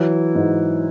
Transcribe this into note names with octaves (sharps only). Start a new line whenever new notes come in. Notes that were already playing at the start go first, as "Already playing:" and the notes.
Already playing: E3 F#3
G#2